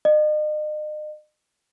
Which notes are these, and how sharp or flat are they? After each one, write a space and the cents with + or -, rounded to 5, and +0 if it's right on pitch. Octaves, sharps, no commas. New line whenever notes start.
D#5 -40